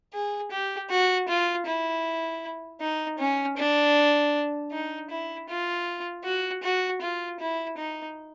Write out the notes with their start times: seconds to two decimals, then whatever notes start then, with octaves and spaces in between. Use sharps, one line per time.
0.14 G#4
0.51 G4
0.90 F#4
1.28 F4
1.66 E4
2.81 D#4
3.19 C#4
3.57 D4
4.72 D#4
5.10 E4
5.49 F4
6.25 F#4
6.63 F#4
7.02 F4
7.40 E4
7.78 D#4